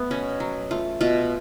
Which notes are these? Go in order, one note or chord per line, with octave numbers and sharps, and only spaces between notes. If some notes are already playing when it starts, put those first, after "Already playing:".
Already playing: A3 B3
B2 C#4
F#3
A3 F4
B2 F4